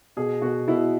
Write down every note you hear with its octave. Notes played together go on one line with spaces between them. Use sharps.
B2 G#4
B2 F#4
B2 E4